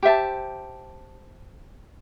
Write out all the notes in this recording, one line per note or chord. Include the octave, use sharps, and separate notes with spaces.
G4 C5 E5 A5